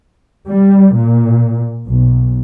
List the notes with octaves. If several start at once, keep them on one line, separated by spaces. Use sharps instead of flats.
G3
A#2
B1